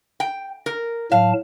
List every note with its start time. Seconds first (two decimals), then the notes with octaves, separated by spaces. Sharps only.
0.20 G5
0.66 A#4
1.12 A2 F#3 F5 A5